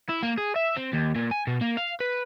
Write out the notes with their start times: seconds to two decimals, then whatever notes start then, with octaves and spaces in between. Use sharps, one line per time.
0.09 E4
0.23 A#3
0.38 G#4
0.56 E5
0.77 C4
0.94 D#2
1.16 A#2
1.31 G#5
1.47 B2
1.61 A#3
1.77 F5
2.00 B4